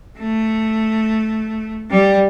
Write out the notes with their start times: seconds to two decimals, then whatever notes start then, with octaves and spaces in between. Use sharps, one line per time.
0.19 A3
1.90 G3